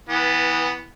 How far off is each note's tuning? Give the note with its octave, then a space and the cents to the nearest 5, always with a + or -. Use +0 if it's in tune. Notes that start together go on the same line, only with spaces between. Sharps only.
E3 -20 B3 +0